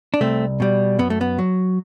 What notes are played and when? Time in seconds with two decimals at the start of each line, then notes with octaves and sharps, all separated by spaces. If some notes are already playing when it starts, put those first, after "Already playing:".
0.14 D4
0.21 C2 A3 C4
0.60 B2 G3
0.99 F#2 B3
1.10 A3
1.21 B3
1.39 F#3